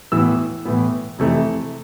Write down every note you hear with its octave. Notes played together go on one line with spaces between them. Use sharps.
A2 E3 B3 E6
A2 E3 B3
F2 C3 E3 A3